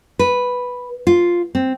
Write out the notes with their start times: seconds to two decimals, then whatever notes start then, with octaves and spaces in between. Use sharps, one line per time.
0.19 B4
1.07 F4
1.55 C4